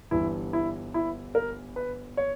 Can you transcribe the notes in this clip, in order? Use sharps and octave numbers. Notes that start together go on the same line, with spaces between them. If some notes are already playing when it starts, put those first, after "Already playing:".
G1 G2 E3 E4
E4
E4
A#4
B4
C#5